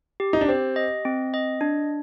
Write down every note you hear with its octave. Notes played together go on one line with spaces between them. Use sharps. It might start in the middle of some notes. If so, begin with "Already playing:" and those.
G4
D#4
D4
C4 G4
D#5
C4
D#5
D4